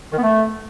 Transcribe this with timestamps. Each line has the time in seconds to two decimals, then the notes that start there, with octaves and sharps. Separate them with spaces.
0.12 D#3
0.17 B3
0.22 A3